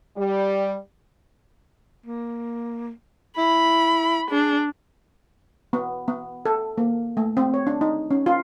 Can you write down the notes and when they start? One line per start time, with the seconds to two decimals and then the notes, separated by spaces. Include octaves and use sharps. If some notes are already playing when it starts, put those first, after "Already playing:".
0.16 G3
2.06 A#3
3.38 E4 B5
4.31 D4 G#4
5.73 B3
6.08 B3
6.45 A4
6.78 A#3
7.17 A3
7.37 C4
7.54 C#5
7.67 D4
7.81 D#4
8.11 C#4
8.26 F4